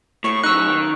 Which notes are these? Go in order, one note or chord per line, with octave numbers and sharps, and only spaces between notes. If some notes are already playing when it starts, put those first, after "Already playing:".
A2 C#6
F#2 D#4 E6 F#6
D#3